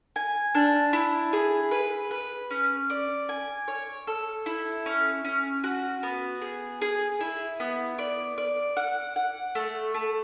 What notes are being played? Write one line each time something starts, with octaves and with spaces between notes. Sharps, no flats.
G#5
D4
E4
G#4
B4
B4
C#4
D5
G#5
C#5
A4
E4
C#4
C#4
F#4
B3
G#4
G#4
E4
B3
D5
D5
F#5
F#5
A3
A3